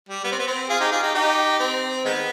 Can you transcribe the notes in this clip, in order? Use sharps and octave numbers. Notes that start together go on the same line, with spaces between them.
G3
B3
C4
B3
C4
F4 G#4
D#4 G4
F4 G#4
D#4 G4
D#4 G4
C4
D#3 G#3 B3